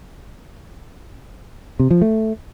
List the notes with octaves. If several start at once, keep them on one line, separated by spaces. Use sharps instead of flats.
C3
F3
A3